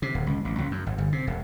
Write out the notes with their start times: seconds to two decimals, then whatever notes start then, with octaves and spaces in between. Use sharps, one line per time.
0.02 C3
0.14 D1
0.27 C#2
0.45 A1
0.58 C#2
0.71 F#2
0.86 G#1
0.98 G1
1.12 C3
1.27 E1